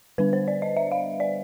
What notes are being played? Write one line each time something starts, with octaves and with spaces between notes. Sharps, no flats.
D3 G3 B3 D4 B4
C5
D5
D#5
E5
F5
D5